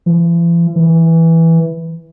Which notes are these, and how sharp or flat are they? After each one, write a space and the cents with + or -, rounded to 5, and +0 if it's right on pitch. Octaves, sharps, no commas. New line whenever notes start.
E3 +45
E3 -5